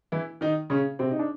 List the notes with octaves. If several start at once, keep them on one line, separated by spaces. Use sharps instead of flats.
E3 E4
D#3 D#4
C#3 C#4
C3 C4
D#4
D4